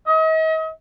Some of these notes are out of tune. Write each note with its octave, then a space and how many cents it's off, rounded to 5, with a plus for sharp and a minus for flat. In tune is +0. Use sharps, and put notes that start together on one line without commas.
D#5 +40